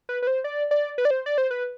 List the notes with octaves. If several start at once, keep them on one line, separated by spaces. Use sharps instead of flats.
B4
B4
C5
D5
D5
B4
D5
C5
D5
C5
B4